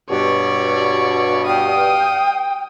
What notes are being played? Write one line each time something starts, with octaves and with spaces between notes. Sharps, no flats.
G2 B2 C#5 D5
F5 G5 D#6